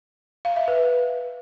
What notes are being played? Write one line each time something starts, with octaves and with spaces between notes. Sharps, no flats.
F5
E5
B4